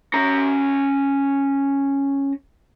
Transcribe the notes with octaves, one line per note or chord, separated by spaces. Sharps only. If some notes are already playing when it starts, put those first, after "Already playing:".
C#4 A#5